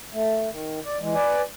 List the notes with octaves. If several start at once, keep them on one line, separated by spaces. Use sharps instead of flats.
A3
D#3
D5
E3 G#3
B4 D5 G#5